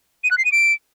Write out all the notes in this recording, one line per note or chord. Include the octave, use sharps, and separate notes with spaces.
D#7
F#6
C7
D#7
D7